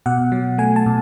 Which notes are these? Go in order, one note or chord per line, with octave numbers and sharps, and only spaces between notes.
B2 F#5
F#3
A3 G#5
A5
B2